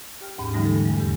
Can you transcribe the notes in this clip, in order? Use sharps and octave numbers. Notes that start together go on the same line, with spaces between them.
G4 G5 F6
D#2 G#2 C#4 G4 B5
D3 E3 G3 A3 D#4
G#3 A4
E2 G#3
C#3 G4